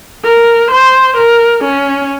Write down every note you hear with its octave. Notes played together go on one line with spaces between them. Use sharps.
A#4
C5
A#4
C#4